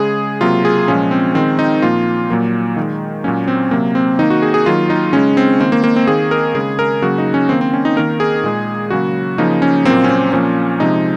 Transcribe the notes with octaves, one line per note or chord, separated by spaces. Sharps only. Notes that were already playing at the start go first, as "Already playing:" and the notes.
Already playing: C#3 G#3 G#4
C3 F#3 A#3 F4
G#4
A#2 F3 G#3 C#4
C4
D#3 G#3 C4
D#4
A#2 F3 A#3 F4
A#2 F#3 A#3
D#3 G#3
A#2 F#3 A#3 C#4
C4
C3 F#3 A#3
C4
D#3 A#3 D#4
F#4
G#4
G#4
D#3 F#3 A#3 F4
D#4
C#3 G#3 C#4
C4
D#3 A#3 C4
A#3
A#3
C4
D#3 A#3 G#4
A#4
C#3 G#3 G#4
A#4
C#3 F#3 A#3 F#4
D#4
C#4
D#3 A#3 C4
C4
C#4
D#4
D#3 A#3 A#4
G#4
A#2 G#3
C#3 F#3 A#3 F#4
C#3 F3 A#3 D#4
C#4
A#2 F#3 A#3 C4
C#4
C4
A#2 F3 A#3 C#4
C3 F3 G#3 D#4